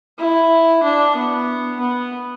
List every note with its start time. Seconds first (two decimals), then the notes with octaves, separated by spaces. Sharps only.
0.19 E4
0.83 D4
1.16 B3
1.80 B3